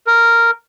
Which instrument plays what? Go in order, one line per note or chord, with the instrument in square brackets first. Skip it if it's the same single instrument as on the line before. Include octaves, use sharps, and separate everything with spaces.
[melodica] A#4